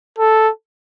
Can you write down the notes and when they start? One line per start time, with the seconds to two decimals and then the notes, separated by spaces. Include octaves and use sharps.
0.18 A4